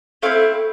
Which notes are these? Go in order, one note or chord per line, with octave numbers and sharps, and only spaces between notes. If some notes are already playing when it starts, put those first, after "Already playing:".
A3 C4 E4 F5